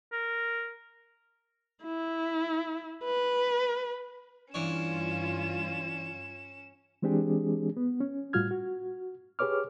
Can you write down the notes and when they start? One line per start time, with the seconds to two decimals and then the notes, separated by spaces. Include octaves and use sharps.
0.13 A#4
1.84 E4
3.04 B4
4.54 G2 E3 C#4 D4 F4 C#5 E7
7.02 E3 G#3 C4 D4 G4 G#4
7.77 B3
8.00 C#4
8.33 A2 G3 F4 F#4 F6 G#6
8.51 F#4
9.39 G4 G#4 B4 C#5 D6 F6